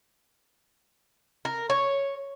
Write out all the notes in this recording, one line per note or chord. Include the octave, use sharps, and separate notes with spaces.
A#4
C#5